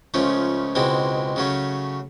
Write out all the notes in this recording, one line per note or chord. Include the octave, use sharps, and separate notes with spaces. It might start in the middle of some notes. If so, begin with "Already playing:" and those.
C#2 C#3 F3 A3 C#4
C#2 B2 G#3 C4 E4
C#3 F#3 A3 C#4